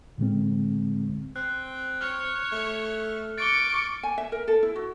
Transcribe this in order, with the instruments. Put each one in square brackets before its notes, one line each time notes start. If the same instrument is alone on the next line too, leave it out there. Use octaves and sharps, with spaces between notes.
[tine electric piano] A2 D3 G#3 C4
[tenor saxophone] C4 [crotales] F#6
[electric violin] C#5 [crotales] F6
[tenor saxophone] A3
[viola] C#6 D6 [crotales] A6 C#7 G7 [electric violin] D7
[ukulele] G#5
E5
A#4
A4
E4
F#4